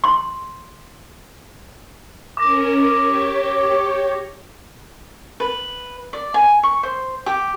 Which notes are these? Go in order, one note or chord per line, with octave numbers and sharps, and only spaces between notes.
C6
C#4 A#4 D6 A#6
G4 C#5
B4
D5
G#5
C#6
C5
G4